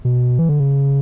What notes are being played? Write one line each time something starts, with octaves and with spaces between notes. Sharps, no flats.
B2
E3
D3
C#3